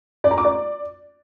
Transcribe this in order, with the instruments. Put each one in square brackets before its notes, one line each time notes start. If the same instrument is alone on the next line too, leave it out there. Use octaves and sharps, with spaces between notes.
[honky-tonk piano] D5
A#5
D6
D5